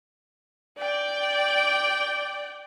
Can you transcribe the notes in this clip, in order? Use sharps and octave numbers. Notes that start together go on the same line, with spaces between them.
D5 G5